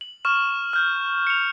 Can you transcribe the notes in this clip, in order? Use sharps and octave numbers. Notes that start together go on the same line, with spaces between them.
F#7
C#6 F6 E7
F6 G6
C#7 F7